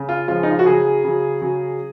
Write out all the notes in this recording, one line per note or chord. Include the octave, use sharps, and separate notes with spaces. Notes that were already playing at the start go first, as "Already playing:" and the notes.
Already playing: C#3
F4
C#3 F3 G#3 F4
D#4
F4
F#4
C#3 F#3 G#4
C#3 F#3
C#3 F#3